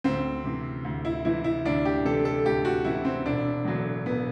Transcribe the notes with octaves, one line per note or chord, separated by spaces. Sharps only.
D2 C4
C3 E3
D2
E4
C3 E3 E4
E4
D2 D4
G4
C3 E3 A4
A4
D2 G4
F#4
C3 E3 E4
C4
E1 D4
E2 D3 F#3
E1 B3